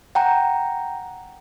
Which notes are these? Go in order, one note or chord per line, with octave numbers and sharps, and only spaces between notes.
F#5 G5 A#5